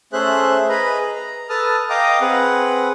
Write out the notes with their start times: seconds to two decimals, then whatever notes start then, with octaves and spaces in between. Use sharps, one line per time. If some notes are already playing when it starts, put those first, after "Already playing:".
0.13 A3 C#4 G#4 C5 E5 F#6
0.69 G#4 B4 D#5 A#5 B5
1.15 A#5
1.49 A4 B4 A5 D#6 F6
1.90 D#5 F5 G5 A#5 D6 D#6
2.21 C4 G#4 B4 F#5